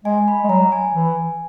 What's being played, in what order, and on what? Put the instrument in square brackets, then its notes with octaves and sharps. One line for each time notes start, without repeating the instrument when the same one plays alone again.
[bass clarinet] G#3 [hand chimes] G#5
[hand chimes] B5
[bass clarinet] G#3
[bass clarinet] F#3 [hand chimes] A#5
[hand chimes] G#5
[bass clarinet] E3